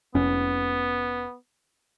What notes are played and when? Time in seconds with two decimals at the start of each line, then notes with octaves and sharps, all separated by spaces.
0.15 F1 B3 C#4